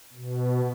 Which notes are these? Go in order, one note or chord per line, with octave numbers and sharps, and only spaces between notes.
B2